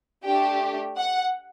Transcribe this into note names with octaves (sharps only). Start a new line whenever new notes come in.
A3 D4 G4 G5
F#5